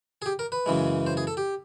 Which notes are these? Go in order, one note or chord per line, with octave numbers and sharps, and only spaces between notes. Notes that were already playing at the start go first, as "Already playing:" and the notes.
G#4
G4
A#4
B4
F#2 C#3 E3 G#3
C5
G#4
A4
G4